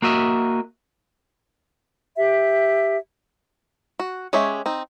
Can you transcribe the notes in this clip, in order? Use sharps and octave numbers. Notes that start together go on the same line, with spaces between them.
A#3 F#4 D#5 E5
G4 E5
F#4
G#3 C#4 G4 C#5 E5
C4 D#4